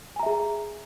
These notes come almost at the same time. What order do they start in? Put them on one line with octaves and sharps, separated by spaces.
G#5 A#5 E5 G#4